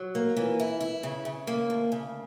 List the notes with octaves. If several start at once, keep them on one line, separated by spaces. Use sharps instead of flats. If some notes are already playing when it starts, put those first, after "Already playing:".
Already playing: F#3
A#3
E3
E4
E4
C#3
C#3
A#3
D2
C#3